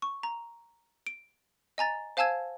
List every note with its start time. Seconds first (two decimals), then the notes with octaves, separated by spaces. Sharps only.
0.02 C#6
0.23 A#5
1.07 D7
1.78 D#5 G#5 A#5 A6
2.17 C5 F5 G#5 A5 E6 G#6